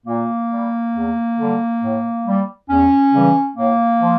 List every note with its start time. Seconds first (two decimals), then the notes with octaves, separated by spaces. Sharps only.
0.06 A#2 A#3
0.50 G3
0.94 E2
1.37 D3 G3
1.82 A2
2.26 G3
2.69 E2 C#4
3.13 C#3 E3 G3
3.57 A2 A#3
4.00 F3